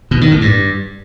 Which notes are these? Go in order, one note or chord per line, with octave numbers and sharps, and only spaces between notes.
B2
D#3
A2
G2